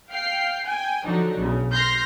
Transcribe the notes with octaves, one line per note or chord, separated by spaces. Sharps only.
F5 G5 C7
G5 G#5
D3 F3 F#3 D4 D#4
B1 C#3
C6 F6 G6 A#6 C7